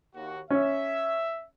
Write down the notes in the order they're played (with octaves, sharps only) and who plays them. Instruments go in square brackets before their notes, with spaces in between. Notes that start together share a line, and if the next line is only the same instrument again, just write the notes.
[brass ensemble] D#2 F#4
[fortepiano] C#4 [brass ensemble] E5